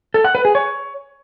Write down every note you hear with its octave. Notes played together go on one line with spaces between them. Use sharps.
A4
F#5
B4
G#4
C#5